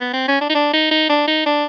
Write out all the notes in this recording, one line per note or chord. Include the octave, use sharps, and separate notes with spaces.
B3
C4
C#4
D4
D#4
D4
D#4
D#4
D4
D#4
D4